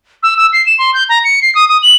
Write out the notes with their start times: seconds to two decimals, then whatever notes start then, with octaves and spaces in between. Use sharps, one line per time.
0.23 E6
0.37 E6
0.53 C7
0.66 E7
0.79 C6
0.94 G6
1.09 A#5
1.24 C#7
1.42 C7
1.55 D#6
1.69 D#6
1.82 F#7